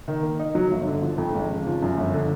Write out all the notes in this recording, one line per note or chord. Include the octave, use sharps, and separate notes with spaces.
D#3
A#3
D#4
F#3
G1
D3
F3
F2
G#1
C#3
F3
F#2
G1
D3